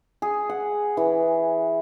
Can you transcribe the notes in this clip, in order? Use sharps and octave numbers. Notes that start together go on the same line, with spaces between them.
G#4
F#5
E3